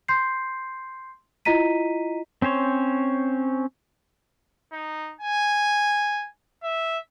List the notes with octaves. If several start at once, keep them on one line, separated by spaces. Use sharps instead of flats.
C6 G6 C7
E4 F4 D#5 A#5 B6 D#7
C4 C#4 C5 C#5
D#4
G#5
E5